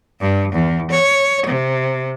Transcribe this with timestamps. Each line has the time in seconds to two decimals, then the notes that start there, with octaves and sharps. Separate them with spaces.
0.21 G2
0.52 E2
0.91 C#5
1.46 C3